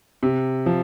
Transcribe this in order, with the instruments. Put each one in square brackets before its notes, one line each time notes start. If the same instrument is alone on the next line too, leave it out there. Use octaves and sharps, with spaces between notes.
[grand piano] C3
F3